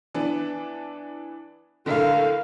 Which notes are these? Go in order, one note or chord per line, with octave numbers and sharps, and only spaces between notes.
E3 B3 D4
A2 D3 A#4 F5